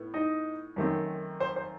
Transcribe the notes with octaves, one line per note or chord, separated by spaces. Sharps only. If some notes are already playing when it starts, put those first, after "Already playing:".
Already playing: A2 B3
D#4 D#5
F#2 D#3 A3 C4
C5
C5